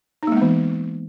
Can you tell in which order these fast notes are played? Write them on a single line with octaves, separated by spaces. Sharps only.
D#4 A#3 G#3 B3 E3